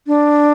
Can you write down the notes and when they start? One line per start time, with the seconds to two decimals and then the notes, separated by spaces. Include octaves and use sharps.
0.07 D4